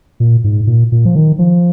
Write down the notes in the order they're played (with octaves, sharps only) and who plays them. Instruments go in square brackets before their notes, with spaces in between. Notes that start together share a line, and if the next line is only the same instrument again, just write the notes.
[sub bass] A#2
G#2
A#2
A#2
F3
D#3
F3